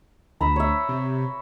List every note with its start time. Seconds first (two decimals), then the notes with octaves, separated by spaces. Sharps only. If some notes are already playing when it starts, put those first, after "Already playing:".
0.41 D2 A#5 B5 E6
0.56 C#5 E5
0.89 C3